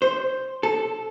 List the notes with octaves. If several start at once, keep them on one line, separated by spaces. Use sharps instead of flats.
C5
A4